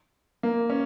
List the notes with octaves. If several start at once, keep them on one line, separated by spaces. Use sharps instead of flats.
A#3
C#4